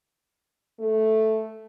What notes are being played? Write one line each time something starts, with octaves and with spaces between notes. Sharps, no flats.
A3